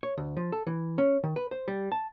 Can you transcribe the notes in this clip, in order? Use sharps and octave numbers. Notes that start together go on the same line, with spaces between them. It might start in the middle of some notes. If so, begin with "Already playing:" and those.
C#5
D2
F3
A4
E3
C#4
D#3
B4
C5
G3
A5